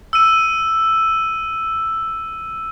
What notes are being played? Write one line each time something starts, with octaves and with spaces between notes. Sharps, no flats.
E6 D#7